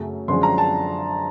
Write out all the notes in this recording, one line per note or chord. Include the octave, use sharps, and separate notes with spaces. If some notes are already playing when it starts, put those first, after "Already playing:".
Already playing: F#2 C#3 F#3 A3 C#4
F#2 D3 F3 G#3 C#4 C6
A#5
A5